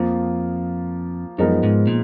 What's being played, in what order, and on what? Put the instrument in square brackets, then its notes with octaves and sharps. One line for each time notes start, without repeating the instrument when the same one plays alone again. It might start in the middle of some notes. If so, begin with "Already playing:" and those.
Already playing: [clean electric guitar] F2 [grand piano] F3 A#3 F4
[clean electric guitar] F#2 [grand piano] F3 G#3 B3 D#4 A#4
[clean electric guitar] G#2
A#2